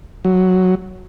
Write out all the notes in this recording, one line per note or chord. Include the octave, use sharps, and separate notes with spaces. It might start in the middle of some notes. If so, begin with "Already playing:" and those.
F#3